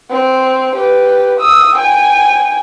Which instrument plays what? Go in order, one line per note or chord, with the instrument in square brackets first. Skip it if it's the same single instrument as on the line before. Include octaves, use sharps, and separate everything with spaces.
[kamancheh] C4
G4 B4
D#6 E6
G5 G#5